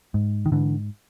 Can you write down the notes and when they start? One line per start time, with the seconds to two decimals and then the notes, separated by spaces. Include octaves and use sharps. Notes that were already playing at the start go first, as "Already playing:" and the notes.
0.14 G#2
0.46 D#3
0.52 G#2 D3 E3